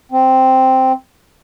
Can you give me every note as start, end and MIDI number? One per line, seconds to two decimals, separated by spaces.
0.12 0.92 60